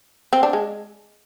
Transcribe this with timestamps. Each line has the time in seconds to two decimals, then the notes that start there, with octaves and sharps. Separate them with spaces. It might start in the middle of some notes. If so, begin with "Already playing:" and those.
0.33 C4
0.43 D4
0.53 G#3